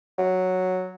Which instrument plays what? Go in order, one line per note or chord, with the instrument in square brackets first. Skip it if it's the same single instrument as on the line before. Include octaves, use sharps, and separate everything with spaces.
[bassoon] F#3